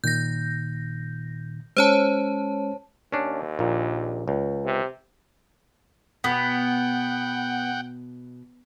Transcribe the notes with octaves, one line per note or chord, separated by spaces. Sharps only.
A#2 D#3 G6 A#6
G#3 C#4 C5 C#5 A5
D#2 C#4 D4
A#1 A#2
C#2
C3
B2 B3 F#5 G5